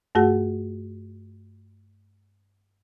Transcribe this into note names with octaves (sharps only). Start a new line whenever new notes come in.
G2 A3 F#4 G#4 F#5